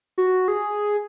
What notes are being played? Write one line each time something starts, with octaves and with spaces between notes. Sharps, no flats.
F#4
G#4